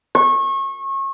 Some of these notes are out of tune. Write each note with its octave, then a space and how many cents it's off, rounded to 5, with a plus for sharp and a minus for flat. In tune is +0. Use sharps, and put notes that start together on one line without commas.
C#6 -30